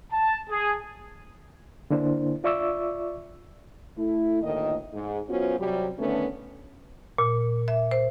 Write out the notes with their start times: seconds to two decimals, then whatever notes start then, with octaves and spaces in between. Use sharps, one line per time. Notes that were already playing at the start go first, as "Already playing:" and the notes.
0.12 A5
0.50 G#4
1.90 D3 A#3 D4 E4 C5
2.44 F4 D5 E5 C#6 D6 E6
3.98 A3 E4
4.43 D2 A2 D#3 A#3 D#5
4.94 G#2
5.29 F#2 B3 C#4 F4 F#4 C5
5.60 C3 F#3 G3
5.99 D3 D#3 A3 B3 C#4
7.18 A#2
7.68 E5
7.91 C5